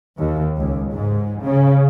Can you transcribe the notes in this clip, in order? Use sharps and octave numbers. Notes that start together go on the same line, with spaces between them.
D#2
C#2
G#2
C#3